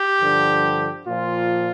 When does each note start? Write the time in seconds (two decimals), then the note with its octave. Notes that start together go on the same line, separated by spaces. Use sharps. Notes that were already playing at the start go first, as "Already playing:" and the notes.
Already playing: G4
0.20 G2 D3 F3
1.07 A#2 F3 F4